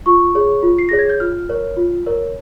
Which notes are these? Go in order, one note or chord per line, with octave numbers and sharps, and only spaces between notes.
F4 C#6
G#4 C#5
F4
C7
G#4 C#5 A#6
G#6
G6
F4 F6
A#4 C#5
F4
A#4 C#5